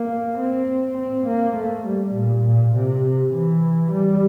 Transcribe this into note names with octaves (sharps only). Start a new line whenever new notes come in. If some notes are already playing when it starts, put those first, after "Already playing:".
Already playing: A#3
C4
C4
A#3
A3
G3
A#2
A#2
C3
E3
G3